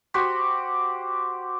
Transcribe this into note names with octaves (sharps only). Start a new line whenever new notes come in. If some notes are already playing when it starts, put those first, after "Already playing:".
F#4 G4 C5